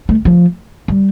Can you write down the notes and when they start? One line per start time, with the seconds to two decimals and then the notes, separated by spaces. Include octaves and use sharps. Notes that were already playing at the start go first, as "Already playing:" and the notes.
0.09 A3
0.25 F3
0.88 G3